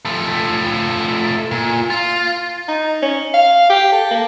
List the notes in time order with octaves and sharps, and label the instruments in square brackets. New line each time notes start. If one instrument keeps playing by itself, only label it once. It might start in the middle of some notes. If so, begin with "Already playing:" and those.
[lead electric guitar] F3 A3
A#2
F4
[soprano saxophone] D#4
C#4
F5
G4
A4
A#3